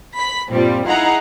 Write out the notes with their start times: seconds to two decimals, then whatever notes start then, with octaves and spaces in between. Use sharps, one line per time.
0.13 B5 B6
0.51 G2 A#2 F3 G3 C4
0.85 D#4 E4 G#4 F5 F#5 A#5